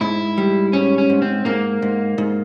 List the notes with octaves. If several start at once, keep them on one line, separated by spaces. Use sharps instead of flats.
G#2 E4
G3
G#2 C#4
C#4
G#2
C4
G#2 A#3
G#2
G#2